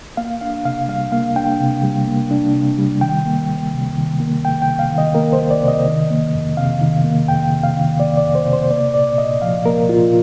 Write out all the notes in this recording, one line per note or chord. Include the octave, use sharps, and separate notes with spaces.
A#3 F5
D4 F5
C3 F5
G3 F5
A#3 F5
D4 G5
C3
G3
A#3
D4
C3
G3
D#3 G5
A#3
C2
C3
D#3
A#3
C2 G5
G5
C3
F5
D#3
D#5
A#3 A#4
C5
C2
D5
C3
D#5
D#3
A#3
F2
C3 F5
D#3
A#3
F2 G5
C3
F5
D#3
A#3 D5
D5
F2
C5
C3
C5
A#3 D5
A#2 D5
A#2 D#5
F3 F5
A#3 A#4
A#2 F4